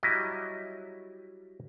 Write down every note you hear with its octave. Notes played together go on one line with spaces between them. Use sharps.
F#3 G3 E4 D#5